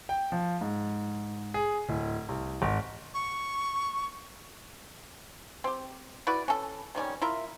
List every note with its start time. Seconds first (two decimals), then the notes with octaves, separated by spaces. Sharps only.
0.09 G5
0.32 F3
0.61 G#2
1.54 G#4
1.89 D1
2.29 C2
2.62 G#1
3.14 C#6
5.64 C4 G4
6.27 E4 F#4 B4 D5
6.48 C#4 A4
6.95 C3 D#3 G3 C#4
7.22 E4 F4 A#4 E5